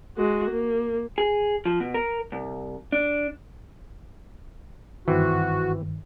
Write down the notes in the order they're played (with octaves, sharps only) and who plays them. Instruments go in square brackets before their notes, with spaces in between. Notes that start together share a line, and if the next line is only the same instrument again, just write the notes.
[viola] G#3 F#4
A#3
[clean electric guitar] G#4
F3
B2
A#4
C2
D4
[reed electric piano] G2 D#3 [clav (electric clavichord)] E3 C4 [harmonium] F#4